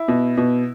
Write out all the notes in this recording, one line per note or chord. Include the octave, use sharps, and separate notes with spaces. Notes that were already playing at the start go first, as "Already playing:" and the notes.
Already playing: E4
B2
B2